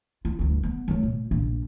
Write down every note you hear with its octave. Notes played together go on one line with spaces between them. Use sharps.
F4
D2 G2
B3
F#3 A3
A#2
A#1 A#2